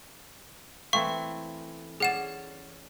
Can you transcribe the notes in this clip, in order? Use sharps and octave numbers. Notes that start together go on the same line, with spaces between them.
E3 A3 C4 F5 C#6
C#4 G#4 D5 F#5 E7